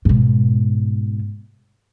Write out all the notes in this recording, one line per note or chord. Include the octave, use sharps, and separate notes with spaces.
G#2 B2